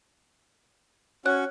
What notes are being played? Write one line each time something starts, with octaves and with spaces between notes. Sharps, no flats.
C#4 F#4 C#5 F#6